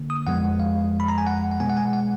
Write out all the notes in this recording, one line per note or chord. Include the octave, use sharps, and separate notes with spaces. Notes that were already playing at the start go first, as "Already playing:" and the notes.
Already playing: D3 A#3
D#6
F2 F3 G#3 B3 F#5
F5
B5
A#5
G#5
F#5
F#5
B2 G#3 B3 G#5
F#5
G#5
F#5